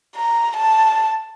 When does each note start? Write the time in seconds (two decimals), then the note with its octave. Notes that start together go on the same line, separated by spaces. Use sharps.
0.16 A#5
0.56 A5